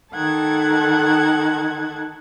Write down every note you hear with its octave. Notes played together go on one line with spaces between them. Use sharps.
D#3 A4 F#5 A5 G#6